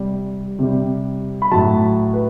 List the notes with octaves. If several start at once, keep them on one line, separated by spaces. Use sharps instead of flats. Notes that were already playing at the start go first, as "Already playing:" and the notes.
Already playing: C3 G3
C3 G3
B5
A2 F#3 A5
B4